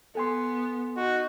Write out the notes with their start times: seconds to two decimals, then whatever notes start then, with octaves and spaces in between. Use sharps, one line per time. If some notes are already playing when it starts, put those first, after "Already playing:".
0.15 B3 A4 G#5 C6
0.97 D#4 F#4